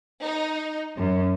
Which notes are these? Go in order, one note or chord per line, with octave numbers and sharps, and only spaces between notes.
D#4
F#2